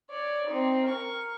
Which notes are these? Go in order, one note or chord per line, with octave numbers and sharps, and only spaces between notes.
C#5 D5
C4 D#4
A#4 C#6